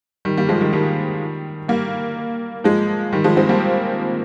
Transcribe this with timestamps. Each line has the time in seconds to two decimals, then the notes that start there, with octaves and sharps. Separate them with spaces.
0.25 D#3 G3
0.37 G3 A#3
0.49 F3 G#3
0.61 D#3 G3
0.73 D#3 G3
1.68 G3 A#3
2.64 F3 G#3
3.13 D#3 G3
3.24 F3 G#3
3.37 G#3 C4
3.49 G3 A#3